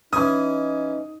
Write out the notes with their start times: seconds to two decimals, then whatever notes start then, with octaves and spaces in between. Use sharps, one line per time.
0.13 E3 C#4 D#4 G#5 D#6